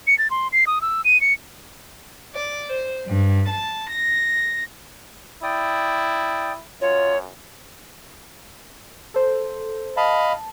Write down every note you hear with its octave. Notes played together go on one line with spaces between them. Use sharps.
C#7
A6
C6
C7
D#6
E6
D#7
C#7
D5
C5
G2
A5
A#6
E4 D5 G5 D#6
F#2 F4 C#5
A4 C5
D#5 F5 A5 B5